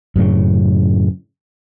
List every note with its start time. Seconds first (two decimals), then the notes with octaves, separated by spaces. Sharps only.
0.16 F#2 A2 C#3